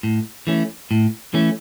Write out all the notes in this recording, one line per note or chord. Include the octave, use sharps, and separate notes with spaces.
A2
E3 A3 C#4
A2
E3 A3 C#4